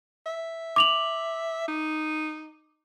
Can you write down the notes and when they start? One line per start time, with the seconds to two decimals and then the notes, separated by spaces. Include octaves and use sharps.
0.26 E5
0.76 D6 F7 F#7
1.68 D#4